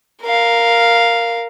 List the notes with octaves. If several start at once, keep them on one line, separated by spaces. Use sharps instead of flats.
A#4 F5